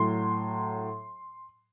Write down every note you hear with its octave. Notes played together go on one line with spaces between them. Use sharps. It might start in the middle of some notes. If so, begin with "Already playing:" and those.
Already playing: A2 F#3 C6